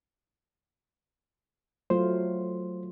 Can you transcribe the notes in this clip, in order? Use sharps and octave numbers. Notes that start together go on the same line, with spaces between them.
F#3 A3 F4 C5